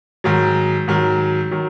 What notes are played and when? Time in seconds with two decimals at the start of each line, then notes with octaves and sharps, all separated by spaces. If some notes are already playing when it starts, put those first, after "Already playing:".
0.24 G#2 D#3 F#3
0.88 G#2 D#3 F#3
1.51 D#3 F#3